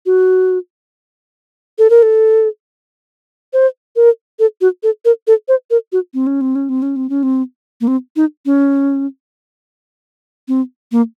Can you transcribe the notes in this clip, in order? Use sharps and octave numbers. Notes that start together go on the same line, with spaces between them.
F#4
A4
A#4
A4
C5
A#4
A4
F#4
A4
A#4
A4
C5
A#4
F#4
C4
C#4
C4
C#4
C4
C#4
C4
C#4
C4
A#3
C4
D#4
C#4
C4
A#3